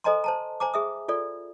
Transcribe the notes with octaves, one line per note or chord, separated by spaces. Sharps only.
A4 C5 D#5 G#5 A#5 C6
C5 A5 A#5
C5 G#5 A#5 D6
G#4 E5 D#6
F4 A4 D5